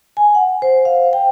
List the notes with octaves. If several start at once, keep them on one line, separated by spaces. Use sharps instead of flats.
G#5
F#5
C5
F5
G5